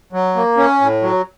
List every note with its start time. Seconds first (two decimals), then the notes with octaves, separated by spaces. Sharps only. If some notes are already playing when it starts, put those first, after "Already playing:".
0.13 F#3
0.36 A#3
0.57 C#4
0.81 A2
1.02 F#3